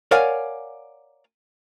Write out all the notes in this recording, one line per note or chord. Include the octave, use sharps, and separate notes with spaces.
A#4 C#5 D5 F5 F#5 G#5